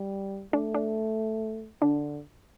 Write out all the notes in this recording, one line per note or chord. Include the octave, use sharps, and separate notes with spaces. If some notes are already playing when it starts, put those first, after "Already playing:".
Already playing: G3
A3 D4
D4
D3 D4